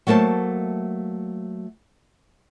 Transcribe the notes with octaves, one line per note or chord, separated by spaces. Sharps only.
F#3 A3 A#3 C5 A5